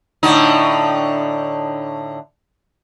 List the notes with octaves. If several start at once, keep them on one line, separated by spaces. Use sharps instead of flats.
A2 D3 D#4